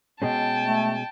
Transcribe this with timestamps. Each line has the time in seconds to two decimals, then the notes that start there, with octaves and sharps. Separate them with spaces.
0.22 B2 G#3 C#4 G5 A5
0.63 A3